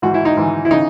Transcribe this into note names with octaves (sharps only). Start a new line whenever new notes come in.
G#2 E3 F#4
E4
D#4
G#2 E3
E4
C#3 E3 D#4